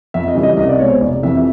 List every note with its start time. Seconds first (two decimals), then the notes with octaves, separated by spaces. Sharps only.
0.14 F2 E5
0.28 D#5
0.35 C#3 E3 G3
0.43 D#5
0.57 C2 D#5
0.69 D5
0.79 B2 G#3 C#5
0.90 C5
1.01 F1 D5
1.23 F2 C3 E3 E5
1.37 E5